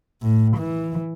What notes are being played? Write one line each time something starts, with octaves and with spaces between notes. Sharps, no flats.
A2
E3